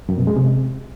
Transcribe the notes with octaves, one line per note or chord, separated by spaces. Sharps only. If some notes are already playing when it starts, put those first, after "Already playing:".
F#2
B2
G#3
C3